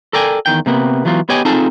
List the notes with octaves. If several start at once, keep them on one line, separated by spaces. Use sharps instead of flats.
A4 A#4 D5 G5 G#5
E2 D#3 G5
C3 A#3 B3
E3 F#3 B3 F4
B3 G4 C#5 D#5 G5 G#5
C4 D#4 F4 G#4 A4 A5